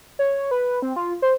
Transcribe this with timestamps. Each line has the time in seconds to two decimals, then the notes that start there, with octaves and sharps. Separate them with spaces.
0.19 C#5
0.51 B4
0.82 C4
0.96 F4
1.22 C5